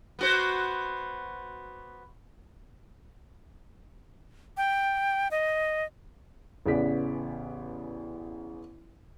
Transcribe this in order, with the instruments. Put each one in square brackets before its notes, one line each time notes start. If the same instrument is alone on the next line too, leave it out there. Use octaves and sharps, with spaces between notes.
[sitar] B3 F#4 C5
[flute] G5
D#5
[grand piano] A1 C#3 B3 D5 B6